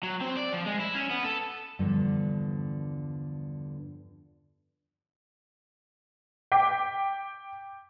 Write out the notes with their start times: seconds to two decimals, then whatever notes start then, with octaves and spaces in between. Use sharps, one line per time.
0.03 F#3
0.21 C4
0.37 D5
0.53 F3
0.67 G#3
0.80 E4
0.95 C#4
1.11 B3
1.24 A4
1.79 E2 G2 D3 F3
6.52 G5 D6 B6